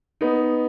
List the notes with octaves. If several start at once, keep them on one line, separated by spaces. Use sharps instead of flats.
B3 D#4